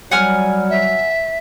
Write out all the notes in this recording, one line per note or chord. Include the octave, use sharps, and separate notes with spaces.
F#3 G3 F#5 G#5 F6
E5